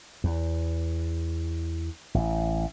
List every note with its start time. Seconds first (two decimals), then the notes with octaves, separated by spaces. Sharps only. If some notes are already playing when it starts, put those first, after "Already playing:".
0.24 E2
2.15 A1